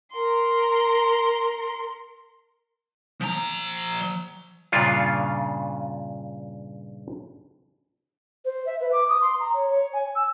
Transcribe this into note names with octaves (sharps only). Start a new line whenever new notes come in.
A#4 C6
F3 A#5
G2 A#2 C#3 C#4 D4 F4
C5
E5
B4
D6
D#6
C6
A#5
C#5
C#5
G#5
E6